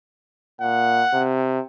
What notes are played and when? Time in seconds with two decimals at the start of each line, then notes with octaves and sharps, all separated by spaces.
0.61 A#2 F#5
1.14 C3